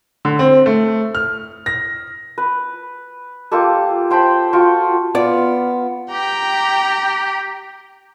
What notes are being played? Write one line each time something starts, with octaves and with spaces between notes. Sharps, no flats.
D3
C4
A3
F6
A#6
B4
A#3 F4 G4 A4
C5 G5 A5 B5
F4 F#4 G5 C#6
B3 F4 D5
G4 G5 A#5